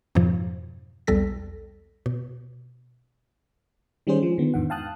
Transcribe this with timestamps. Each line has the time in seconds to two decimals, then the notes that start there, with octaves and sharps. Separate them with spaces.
0.15 F2 G#2 B2 F3
1.07 B1 E2 G3 A4 A#6 B6
2.06 B2
4.07 D#3 G3 G#3 C#4 G#4 C5
4.23 F3
4.38 D3 D#3 B3
4.54 E2 G#2 D#3 F#5
4.70 F5 G5 A5 D#6 F#6